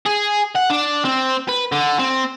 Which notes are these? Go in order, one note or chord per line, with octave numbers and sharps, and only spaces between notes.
G#4
F#5
D4
C4
B4
D3
C4